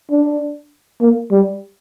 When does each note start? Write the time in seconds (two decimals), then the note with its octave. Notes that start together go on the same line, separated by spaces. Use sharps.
0.11 D4
1.01 A#3
1.31 G3